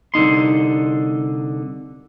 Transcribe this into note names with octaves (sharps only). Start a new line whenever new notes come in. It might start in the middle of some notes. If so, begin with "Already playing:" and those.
C2 D3 D#4 C6